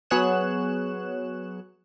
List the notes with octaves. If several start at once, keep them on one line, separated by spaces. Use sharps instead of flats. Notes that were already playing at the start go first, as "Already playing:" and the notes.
F#3 B3 G#4 C#5 F#6 E7